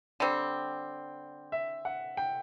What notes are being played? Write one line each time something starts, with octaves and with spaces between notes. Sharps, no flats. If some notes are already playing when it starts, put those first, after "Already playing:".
D3 G3 C4 D5
E5
F#5
G5